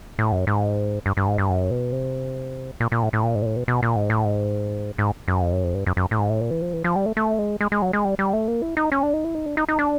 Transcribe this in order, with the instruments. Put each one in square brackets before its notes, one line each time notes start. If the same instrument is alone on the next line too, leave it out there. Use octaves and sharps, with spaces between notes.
[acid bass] A2
F#2
G#2
G2
G2
G#2
G2
F#2
B2
C3
A#2
A#2
A2
A2
A#2
G#2
A#2
A2
B2
B2
A#2
G#2
A2
G#2
G#2
F#2
F2
F#2
F2
G2
F#2
F#2
A2
G#2
A2
A#2
E3
F3
E3
F3
G3
A3
A3
G#3
G#3
G#3
F#3
G#3
G3
G3
A3
A#3
E4
D#4
C#4
D4
D#4
E4
D#4
D4
D#4
D#4
D4